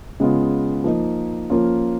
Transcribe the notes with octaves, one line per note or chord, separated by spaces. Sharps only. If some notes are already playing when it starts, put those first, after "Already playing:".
C#3 G#3 B3 F4
F3 A#3 D#4
F3 A#3 C#4 F4